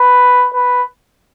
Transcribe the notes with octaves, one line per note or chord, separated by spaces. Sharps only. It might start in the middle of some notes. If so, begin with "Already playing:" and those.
Already playing: B4
B4